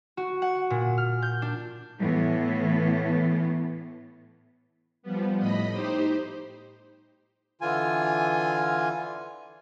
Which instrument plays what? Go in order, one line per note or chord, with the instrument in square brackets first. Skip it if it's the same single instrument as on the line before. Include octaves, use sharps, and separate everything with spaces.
[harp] F#4
F#5
A#2
F6
G6
D4
[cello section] A2 E3 B3
[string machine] F3 G3 B3
A2 D#5 B5
D#4 G4 C5
[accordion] D3 E3 F4 G#5